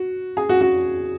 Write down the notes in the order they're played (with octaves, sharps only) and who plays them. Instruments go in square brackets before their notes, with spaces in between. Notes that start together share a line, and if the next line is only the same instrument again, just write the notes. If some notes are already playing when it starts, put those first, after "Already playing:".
Already playing: [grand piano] F#4
G#4
F#4
F#4